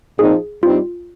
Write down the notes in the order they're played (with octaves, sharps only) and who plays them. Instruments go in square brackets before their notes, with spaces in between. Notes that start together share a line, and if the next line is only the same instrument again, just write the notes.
[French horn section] A#2 F3 C4 D#4 [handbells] G#4
[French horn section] G2 G3 C4 D#4 [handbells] F4